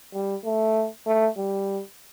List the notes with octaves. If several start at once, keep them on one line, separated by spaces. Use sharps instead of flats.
G3
A3
A3
G3